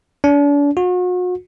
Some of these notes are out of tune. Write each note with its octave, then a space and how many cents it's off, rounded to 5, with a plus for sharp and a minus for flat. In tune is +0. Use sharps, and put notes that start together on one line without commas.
D4 -40
F#4 -40